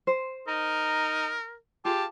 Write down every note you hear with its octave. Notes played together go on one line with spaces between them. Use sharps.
C5
D#4 A#4
F4 G4 G#4 A5